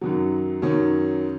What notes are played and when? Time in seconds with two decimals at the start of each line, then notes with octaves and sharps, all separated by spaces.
0.01 F#2 D#3 F#3
0.62 F#2 D#3 F#3 C#4